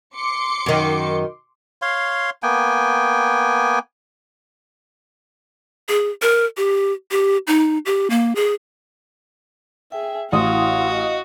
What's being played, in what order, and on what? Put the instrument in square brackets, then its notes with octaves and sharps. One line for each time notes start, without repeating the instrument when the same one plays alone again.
[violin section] C6 D6 C#7
[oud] F#2 D#3
[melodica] C#5 F5 C6
A#3 B3 G5 G#5
[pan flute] G#4
A#4
G4
G4
D#4
G4
A#3
G#4
[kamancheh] G#4 E5 [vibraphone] G5
[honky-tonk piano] A1 D#6 [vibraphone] E4 F#5 C6 [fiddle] F#4 [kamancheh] F5
[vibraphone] D#5